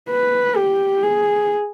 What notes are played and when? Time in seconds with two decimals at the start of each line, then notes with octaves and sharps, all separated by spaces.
0.11 B4
0.57 G4
1.03 G#4